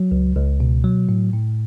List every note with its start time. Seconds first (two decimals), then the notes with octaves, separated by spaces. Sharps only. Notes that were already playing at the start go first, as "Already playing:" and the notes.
Already playing: F#3
0.12 C#2
0.36 C#2
0.60 B2
0.84 F#3
1.09 A2
1.33 A2